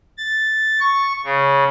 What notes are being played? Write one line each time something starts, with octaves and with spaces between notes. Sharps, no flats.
A6
C#6
C#3